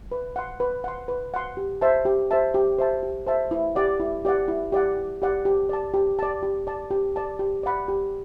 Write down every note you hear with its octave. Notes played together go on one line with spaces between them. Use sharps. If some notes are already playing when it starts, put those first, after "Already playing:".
B4
F#5 C6
B4
F#5 C6
B4
F#5 C6
G4
C5 E5 A5
G4
C5 E5 A5
G4
C5 E5 A5
G4
C5 E5 A5
E4
G4 D5 F#5
E4
G4 D5 F#5
E4
G4 D5 F#5
E4
G4 D5 F#5
G4
D5 A5
G4
D5 A5
G4
D5 A5
G4
D5 A5
G4
D5 F#5 B5
G4